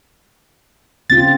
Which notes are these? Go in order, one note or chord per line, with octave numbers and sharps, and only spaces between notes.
C#3 C4 F4 A6